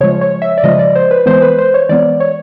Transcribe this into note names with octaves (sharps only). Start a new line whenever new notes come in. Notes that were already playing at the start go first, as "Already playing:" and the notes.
C#3 F3 G#3 C#5
C#5
E5
D5
C#3 F3 G#3 D#5
D5
C5
B4
E3 G#3 B3 C5
B4
C5
C#5
E3 G#3 B3 D5
C#5